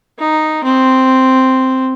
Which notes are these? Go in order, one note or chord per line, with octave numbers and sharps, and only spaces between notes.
D#4
C4